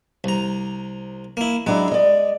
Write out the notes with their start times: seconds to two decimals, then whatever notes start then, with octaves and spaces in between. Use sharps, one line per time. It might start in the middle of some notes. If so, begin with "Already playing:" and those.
0.24 C2 A#5
1.37 A#3 E4
1.67 F#3 G#3 D4 E4
1.91 D5 D#5